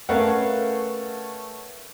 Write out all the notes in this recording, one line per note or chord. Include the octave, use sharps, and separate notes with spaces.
A3 C#4 A#4 B4 F5 F#5